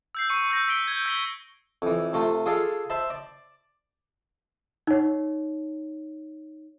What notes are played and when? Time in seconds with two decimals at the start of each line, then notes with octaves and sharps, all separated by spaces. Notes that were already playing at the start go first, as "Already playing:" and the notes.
0.15 E6 G6 C7
0.29 C#6 C7 C#7 D#7
0.50 E6 G6 A#6
0.67 E6 B6 D7 G7
0.88 G6 G#6
1.06 E6 B6 G7
1.82 F2 E3
2.13 C3 A3 F4
2.46 F4 G#4 A4 D5 F5
2.90 C5 E5 A5 B5
3.10 D5
4.87 D#4 C#5